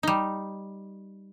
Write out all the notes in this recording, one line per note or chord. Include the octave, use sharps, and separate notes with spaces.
G3 D#4